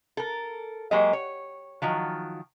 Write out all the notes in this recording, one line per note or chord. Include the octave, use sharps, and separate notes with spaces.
A4 A#4
F#3 G#3 A#3 G4 D#5
C#5
D#3 F3 F#3